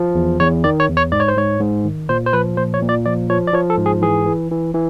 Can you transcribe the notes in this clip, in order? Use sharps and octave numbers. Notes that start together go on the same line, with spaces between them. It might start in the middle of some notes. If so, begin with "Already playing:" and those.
Already playing: F3
E2
E2 C#5
D#3 D5
C#5
E2
C#5
G#2 D5
C#5
C5
G#2 C#5
G#2
D#3
A#2 C5
C5
F3 B4
A#2 C5
C#5
A#2
D5
F3 D5
F3 C#5
D5
F3 C#5
A4
G#2
G#4
E3 G#4
E3
E3
E3